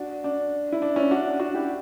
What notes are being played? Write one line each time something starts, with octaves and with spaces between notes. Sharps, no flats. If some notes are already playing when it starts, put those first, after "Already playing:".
Already playing: D4 F#4
D4
E4
D4
C#4 E4
D4 F#4
D4 F#4
E4 G4